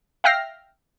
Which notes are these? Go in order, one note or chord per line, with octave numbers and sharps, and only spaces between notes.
E5 F5 G5 F6 A#6 C7